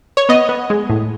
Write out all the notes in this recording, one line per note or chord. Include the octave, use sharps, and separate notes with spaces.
C#5
B3 D#5
B3
G#3
A2